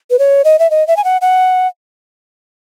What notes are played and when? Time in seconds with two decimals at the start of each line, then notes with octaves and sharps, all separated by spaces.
0.10 B4
0.19 C#5
0.45 D#5
0.59 E5
0.71 D#5
0.88 E5
0.97 G#5
1.04 F#5
1.21 F#5